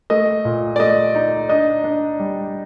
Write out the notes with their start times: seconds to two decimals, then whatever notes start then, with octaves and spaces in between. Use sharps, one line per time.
0.10 A3 D#5
0.45 A#2
0.76 D5
0.79 A3 D#5
1.15 D#4
1.49 D4 D#5
1.84 D4
2.20 G3